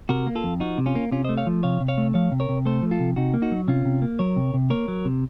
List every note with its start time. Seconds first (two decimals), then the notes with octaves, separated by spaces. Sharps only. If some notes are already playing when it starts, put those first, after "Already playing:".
0.09 C3 F#4 A#4
0.27 A#3
0.35 F4 A4
0.44 F2
0.60 F3 D#4 F#4
0.78 C3
0.86 C#4 F4
0.95 A#3
1.12 C3 C#4 F4
1.24 C5 D#5
1.29 A3
1.37 C#5 F5
1.47 F3
1.63 C3 C#5 F5
1.80 C3
1.88 C#5 F5
1.98 A3
2.14 F3 C#5 F5
2.32 C3
2.40 A#4 C#5
2.49 C3
2.65 A3 A4 C5
2.82 F3
2.91 F4 A4
3.00 C3
3.16 C3 D#4 F#4
3.34 A#3
3.42 D#4 F#4
3.52 F#3
3.68 C3 C#4 F4
3.85 C3
4.02 A#3
4.19 F#3 A#4 C#5
4.36 C3
4.54 C3
4.70 A#3 A#4 C#5
4.88 F#3
5.05 C3